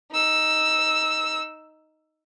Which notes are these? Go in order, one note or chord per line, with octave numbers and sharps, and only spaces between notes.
D#4 E6